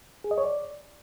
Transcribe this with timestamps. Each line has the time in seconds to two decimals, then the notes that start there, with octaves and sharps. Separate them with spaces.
0.24 G#4
0.31 D#5
0.38 C#5
0.44 D5